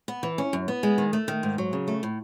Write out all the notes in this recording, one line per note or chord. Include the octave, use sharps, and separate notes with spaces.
B3
E3
C#4
F#2
B3
G#3
D#3
A3
D#3
G#2
F#3
C#3
A3
A2